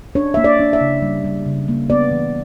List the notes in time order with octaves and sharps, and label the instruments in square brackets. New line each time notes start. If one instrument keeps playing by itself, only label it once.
[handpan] D4 C#5
A#3 E5
D5
D4
E5
C#3
G3
G3
C#3
A#3
B3 D5
E3